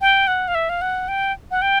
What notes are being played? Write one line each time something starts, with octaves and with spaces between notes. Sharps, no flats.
G5
F#5
F5
E5
F5
F#5
G5
F#5
G5